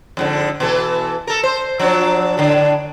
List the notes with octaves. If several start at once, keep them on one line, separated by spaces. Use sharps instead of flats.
F2 G#2 D3
B2 E3 A4
A4 A#4
C5
F3 F#3 D4
A2 D3 D4